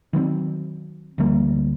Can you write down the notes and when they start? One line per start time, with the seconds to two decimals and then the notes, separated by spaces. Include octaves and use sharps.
0.13 D#3 F#3 B3 C4
1.18 D2 F3 G3 A#3